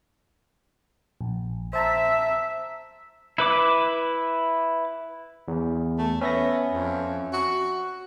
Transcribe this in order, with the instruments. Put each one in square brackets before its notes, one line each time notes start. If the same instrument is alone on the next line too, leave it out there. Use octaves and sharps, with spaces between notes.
[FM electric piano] A#1
[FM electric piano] C5 A5 A#5 [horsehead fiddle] E5
[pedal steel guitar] E4 B4 D6
[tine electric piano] E2
[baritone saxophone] A3
[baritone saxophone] B3 [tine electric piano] C#4 E5 A#6
[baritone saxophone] F2
F#4